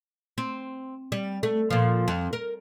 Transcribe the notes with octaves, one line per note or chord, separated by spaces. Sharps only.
C4
G3
A3
A#2 F3
F2
A#4